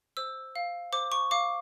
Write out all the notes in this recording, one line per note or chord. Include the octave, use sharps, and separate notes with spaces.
C5 E6
F5
C5 D6
C#6
F5 D6